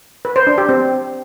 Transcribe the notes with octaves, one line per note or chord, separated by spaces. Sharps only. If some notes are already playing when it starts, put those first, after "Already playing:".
B4
C5
D4
G4
C4